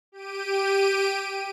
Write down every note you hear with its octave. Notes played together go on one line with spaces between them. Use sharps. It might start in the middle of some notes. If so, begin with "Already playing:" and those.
G4 D7 D#7